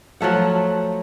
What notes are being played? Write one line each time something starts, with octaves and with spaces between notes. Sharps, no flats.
F3 F#3 A3 F#5